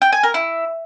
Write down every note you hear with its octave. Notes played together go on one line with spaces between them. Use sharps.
G5
G#5
A#4
E4